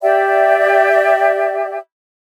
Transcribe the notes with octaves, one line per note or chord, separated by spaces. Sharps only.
G4 D5 E5 G5